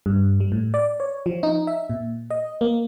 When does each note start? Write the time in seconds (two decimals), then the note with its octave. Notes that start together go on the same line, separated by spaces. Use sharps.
0.06 G2
0.40 G3
0.52 A2
0.74 D5
1.00 C#5
1.26 F3
1.43 D#4
1.67 E5
1.90 A#2
2.30 D#5
2.61 A#3